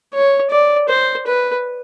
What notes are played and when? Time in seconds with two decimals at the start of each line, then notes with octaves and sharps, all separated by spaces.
0.14 C#5
0.50 D5
0.89 C5
1.27 B4